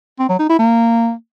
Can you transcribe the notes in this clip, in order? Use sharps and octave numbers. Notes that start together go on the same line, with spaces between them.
C4
F#3
D#4
E4
A#3